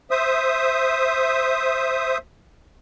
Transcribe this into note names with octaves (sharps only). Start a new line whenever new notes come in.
C5 E5 D#6